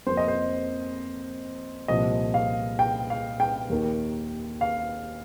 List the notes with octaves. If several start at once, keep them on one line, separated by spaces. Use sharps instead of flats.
F2 F3 A#3 C5
D#5
C5
C2 A#2 F3 A#3 D#5
F5
G5
F5
G5
D#2 D#3 A#3
F5